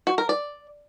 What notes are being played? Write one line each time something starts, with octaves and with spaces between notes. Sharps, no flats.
F#4
A#4
D5